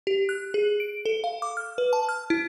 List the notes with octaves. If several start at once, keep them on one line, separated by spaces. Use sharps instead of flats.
G4
F#6
G#4
D7
A4
F5
D6
F6
B4
A5
F6
E4